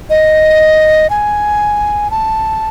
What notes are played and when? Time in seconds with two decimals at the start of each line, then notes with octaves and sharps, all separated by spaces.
0.10 D#5
1.10 G#5
2.11 A5